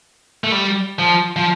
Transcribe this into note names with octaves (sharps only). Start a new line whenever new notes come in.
A3
G3
F3
F3